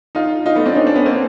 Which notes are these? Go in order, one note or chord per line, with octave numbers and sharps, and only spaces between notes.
D#4 F4
D#4 F4
A3 B3
C4 D4
C#4 D#4
C4 D4
B3 C#4
A#3 C4